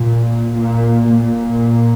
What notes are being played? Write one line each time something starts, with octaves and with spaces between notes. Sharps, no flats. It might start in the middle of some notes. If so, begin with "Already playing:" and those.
Already playing: A#2
A#2
A#2